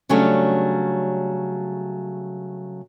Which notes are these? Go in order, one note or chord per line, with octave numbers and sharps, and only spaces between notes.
C#3 F#3 G3 A3 C#4 D4